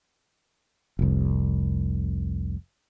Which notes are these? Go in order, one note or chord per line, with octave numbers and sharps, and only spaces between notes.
F1 C2